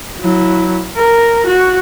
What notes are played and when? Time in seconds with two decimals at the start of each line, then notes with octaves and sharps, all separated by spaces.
0.20 F#3 E4
0.96 A#4
1.46 F#4